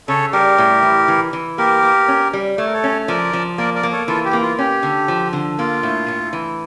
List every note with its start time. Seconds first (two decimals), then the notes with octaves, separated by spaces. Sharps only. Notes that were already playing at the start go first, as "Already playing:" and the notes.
0.08 C#3 A4 C#5
0.33 G3 G4 A#4
0.58 A2
0.83 E3
1.08 E3
1.33 E3
1.58 A#3 G4 A#4
1.83 A#3
2.08 C#4
2.33 G3
2.58 A3 C#5
2.66 A#4
2.73 A4 C#5
2.84 C#4
3.08 F3 A#4 D5
3.33 F3
3.58 A#3 A#4 D5
3.75 A#4 D5
3.83 A#3
3.92 A4 C#5
4.08 E3 F4 A4
4.25 G4
4.33 A#3
4.42 F4
4.58 C#4 G4
4.83 D3
5.08 F3
5.33 D3
5.59 A#3 F4
5.83 A2
6.08 A2
6.33 E3